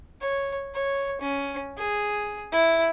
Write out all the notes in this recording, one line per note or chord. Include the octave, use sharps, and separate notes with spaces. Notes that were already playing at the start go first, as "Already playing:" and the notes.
C#5
C#5
C#4
G#4
E4